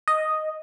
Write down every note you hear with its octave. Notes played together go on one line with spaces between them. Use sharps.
D#5